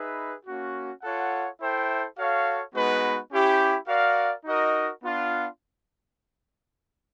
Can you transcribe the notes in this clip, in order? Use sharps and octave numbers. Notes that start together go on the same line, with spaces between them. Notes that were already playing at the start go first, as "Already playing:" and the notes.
Already playing: D#4 G#4 B4 E5
A#3 C#4 F#4
F4 A4 C#5 F#5
E4 A4 C5 E5 G5
F#4 A4 C#5 F5
G#3 B3 D#4 F#4 B4
C#4 E4 G4
F#4 A#4 D5 F5
D#4 F#4 A#4 D#5
B3 D4 F4